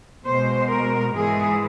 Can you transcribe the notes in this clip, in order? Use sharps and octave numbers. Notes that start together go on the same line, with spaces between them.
B2 G#3 C5
A#4
G#2 E3 G#3 G#4